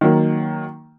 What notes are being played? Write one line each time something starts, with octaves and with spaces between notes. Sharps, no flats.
D#3 F#3 A#3